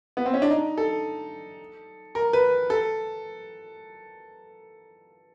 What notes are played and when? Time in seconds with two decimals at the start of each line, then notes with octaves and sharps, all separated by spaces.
0.17 B3
0.26 C4
0.34 C#4
0.42 D4
0.50 D#4
0.78 A4
2.15 A#4
2.33 B4
2.70 A4